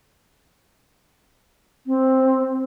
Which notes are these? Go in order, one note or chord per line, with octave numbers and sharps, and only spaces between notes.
C4